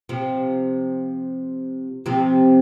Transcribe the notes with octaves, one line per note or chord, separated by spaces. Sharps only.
C3 F3
C3 F3